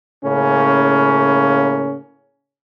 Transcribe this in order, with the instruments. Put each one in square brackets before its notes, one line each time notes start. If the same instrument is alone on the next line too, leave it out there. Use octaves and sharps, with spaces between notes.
[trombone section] A2 C#3 A#3 C#4